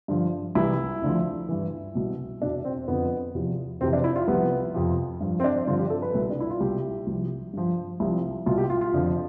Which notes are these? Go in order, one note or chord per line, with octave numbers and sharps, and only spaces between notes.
G2 D3 F3
C2 C3 E3 E4
D2 D3 F3
G2 E3
C2 B2
E2 B2 D4
C4
F2 D3 F3 B3
E2 C3 F3
F2 C3 E3 C4
D4
E4
F4
C2 C3 F3 B3
F2 C3 F3
G2 F3
C4
D4
G2 D3 F3 F4
G4
A4
B4
C2 B2
D4
E4
F4
C2 B2 G4
C2 C3 F3
G2 F3
C2 C3 F3
C2 B2 F4
G4
F4
F4
F2 D3 F3